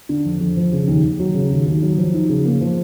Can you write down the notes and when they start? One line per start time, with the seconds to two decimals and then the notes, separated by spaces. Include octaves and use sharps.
0.09 D3
0.25 F2
0.41 F2
0.56 F3
0.72 C#3
0.88 D#2
1.04 D#2
1.20 F#3
1.34 C#3
1.51 D#2
1.66 D#2
1.83 F#3
1.98 F3
2.14 D#4
2.29 C#3
2.45 A#3
2.61 F3